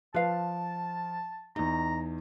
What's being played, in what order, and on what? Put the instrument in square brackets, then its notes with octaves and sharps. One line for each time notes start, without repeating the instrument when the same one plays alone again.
[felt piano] F3 [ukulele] B4 F5 [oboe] A5
[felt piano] E2 D#4 [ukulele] D#5 [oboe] A#5